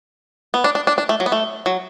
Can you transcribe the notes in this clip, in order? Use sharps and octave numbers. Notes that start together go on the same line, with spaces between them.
B3
D4
D4
D4
D4
A3
F#3
B3
A3
F#3